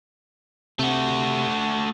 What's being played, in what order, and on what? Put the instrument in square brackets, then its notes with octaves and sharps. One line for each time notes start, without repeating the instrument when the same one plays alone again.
[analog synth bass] C3 [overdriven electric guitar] A3 F#4